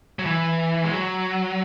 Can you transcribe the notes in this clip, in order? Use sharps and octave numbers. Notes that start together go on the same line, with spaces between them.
F#3
E3
G#3
F#3